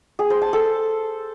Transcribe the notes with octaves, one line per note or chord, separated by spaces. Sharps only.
G#4
C5
A5
A4